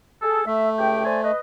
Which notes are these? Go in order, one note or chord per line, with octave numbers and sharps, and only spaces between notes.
G#4 A4
A3 E5
C#2 G4 G5
C5 D5 G#5
B4 D#5